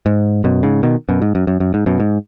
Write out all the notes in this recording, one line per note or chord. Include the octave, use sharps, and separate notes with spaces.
G#2
F#2 B2
G#2 C#3
B2 D#3
F#2 B2
G#2
F#2
F#2
F#2
G#2
F#2 B2
G#2